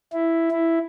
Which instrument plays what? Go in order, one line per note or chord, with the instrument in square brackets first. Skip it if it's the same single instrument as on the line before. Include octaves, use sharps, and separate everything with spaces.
[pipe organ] E4
E4